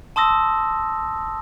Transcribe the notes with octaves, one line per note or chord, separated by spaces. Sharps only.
A5 C6 D#6 E6 A#6